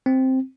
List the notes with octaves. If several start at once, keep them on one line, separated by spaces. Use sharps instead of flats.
C4